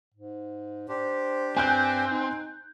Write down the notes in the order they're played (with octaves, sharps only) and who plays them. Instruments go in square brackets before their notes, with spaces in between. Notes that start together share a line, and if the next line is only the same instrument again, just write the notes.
[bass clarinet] G#2
[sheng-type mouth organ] D4 G4 [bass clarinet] C5
[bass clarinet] G2 [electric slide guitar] C4 [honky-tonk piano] G#5 F#6 G6
[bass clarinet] D#4